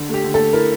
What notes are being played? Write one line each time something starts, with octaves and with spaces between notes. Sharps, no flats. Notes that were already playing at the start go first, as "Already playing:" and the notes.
Already playing: D3
A3
G4
D3
A4
A3
E4 A#4